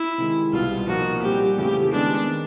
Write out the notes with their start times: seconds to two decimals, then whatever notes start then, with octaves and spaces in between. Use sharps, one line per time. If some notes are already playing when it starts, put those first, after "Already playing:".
Already playing: E4
0.18 C3 D#3 G#3
0.53 C2 B2 G3 B3 F4
0.88 A#2 F3 A#3 D#4 F#4
1.22 A#2 G3 C4 G4
1.57 F2 C#3 E3 A3 G4
1.92 D#3 G#3 B3 D4
2.27 D#3 G#3 C4